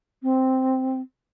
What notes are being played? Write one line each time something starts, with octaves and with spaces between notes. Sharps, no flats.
C4